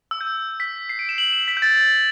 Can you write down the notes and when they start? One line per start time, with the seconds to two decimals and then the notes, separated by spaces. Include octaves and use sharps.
0.11 E6
0.21 G6
0.60 B6
0.89 C7
0.99 D7
1.09 E7
1.18 F#7
1.32 E7
1.48 B6
1.57 G6
1.62 A6